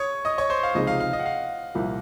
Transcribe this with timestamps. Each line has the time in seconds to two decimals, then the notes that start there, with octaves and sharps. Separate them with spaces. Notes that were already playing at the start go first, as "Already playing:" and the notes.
Already playing: C#5 C#6 D#6
0.25 D#5 D#6
0.38 C#5 C#6
0.50 C5 C6
0.63 F5
0.75 C#2 C3 F3 G#3 D#4 D#5
0.87 F5
1.00 F5
1.13 D#5
1.20 F#5
1.26 F5
1.75 C2 A#2 F3